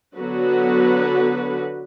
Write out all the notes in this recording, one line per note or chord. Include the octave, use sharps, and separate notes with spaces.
D3 F#3 B3 F#4 B4